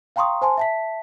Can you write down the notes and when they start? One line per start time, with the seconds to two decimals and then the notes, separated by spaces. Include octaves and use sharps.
0.16 F5 G5 A#5 C6 C#6 D#6
0.42 C5 G#5 A5 C6
0.58 E5 A5 B6